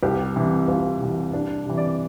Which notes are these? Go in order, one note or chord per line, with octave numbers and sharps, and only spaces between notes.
C2 G4
C3 E3
C2 F4
C3 E3
C2 D4
C3 E3
D5